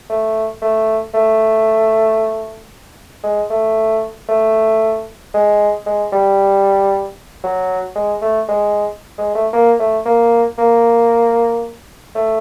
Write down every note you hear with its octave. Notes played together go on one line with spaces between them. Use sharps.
A3
A3
A3
G#3
A3
A3
G#3
G#3
G3
F#3
G#3
A3
G#3
G#3
A3
A#3
A3
A#3
A#3
A3